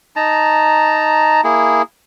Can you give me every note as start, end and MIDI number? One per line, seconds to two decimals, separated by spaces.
0.16 1.41 63
0.16 1.41 81
0.16 1.41 82
1.44 1.82 58
1.44 1.82 64
1.44 1.82 68